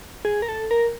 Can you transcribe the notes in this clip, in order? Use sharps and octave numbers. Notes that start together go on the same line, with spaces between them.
G#4
A#4
A4
A#4